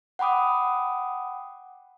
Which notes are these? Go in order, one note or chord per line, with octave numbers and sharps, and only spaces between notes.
F#5 G5 B5 D6 D#6